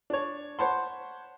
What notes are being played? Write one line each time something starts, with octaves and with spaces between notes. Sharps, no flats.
D4 C#5
C5 C#5 F#5 A5 B5 C6